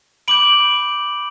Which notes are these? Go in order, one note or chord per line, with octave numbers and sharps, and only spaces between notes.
B5 D6 G6 D7 F#7